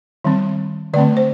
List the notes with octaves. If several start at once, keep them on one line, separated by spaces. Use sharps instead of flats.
D#3 G3 C4
D3 A3 C4 D5
C5